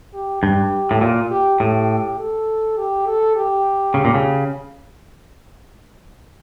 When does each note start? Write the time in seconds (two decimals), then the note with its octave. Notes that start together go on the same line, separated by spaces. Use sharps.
0.14 G4
0.43 G2 G4
0.91 A2
1.01 A#2 F4
1.31 G4
1.60 A2 G4
2.18 A4
2.77 G4
3.06 A4
3.36 G4
3.94 C#3
4.05 A#2
4.14 C#3